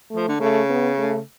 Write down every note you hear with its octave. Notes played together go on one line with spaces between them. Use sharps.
F3 A3
D3
C#3 A3
B3
A3